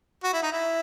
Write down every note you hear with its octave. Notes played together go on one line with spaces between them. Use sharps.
F#4
E4
D#4
E4